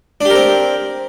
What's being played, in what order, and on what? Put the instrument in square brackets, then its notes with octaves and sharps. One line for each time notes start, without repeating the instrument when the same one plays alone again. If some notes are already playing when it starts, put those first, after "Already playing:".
[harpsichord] D4
G4
A#4
C4